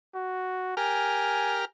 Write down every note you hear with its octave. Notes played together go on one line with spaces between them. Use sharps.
F#4
G4 A#4 G#5 F6